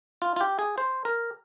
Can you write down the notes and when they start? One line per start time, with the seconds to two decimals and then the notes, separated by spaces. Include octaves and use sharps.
0.22 F4
0.36 F4
0.41 G4
0.59 G#4
0.78 C5
1.05 A#4